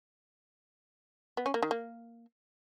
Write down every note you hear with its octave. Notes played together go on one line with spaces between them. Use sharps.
B3
C#4
A#3
D#3
A#3